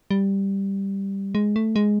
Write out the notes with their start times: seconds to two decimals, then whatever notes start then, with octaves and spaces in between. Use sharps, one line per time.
0.11 G3
1.35 G#3
1.56 A3
1.76 G#3